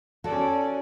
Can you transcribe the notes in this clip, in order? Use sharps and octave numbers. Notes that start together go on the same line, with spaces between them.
C#4 F#4 A4 D5